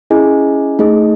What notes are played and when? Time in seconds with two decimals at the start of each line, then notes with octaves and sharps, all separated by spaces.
0.10 C#4 E4 G#4 D#5 G#5
0.79 A3 D#4 G#4 D#5